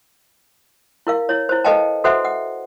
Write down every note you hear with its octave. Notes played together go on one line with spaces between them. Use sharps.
E4 A#4 F5
E4 C#5
E4 C5
A4 B4 D#5 F5 G5 A5
F#4 A4 B4 C5 E5 F#5
F#5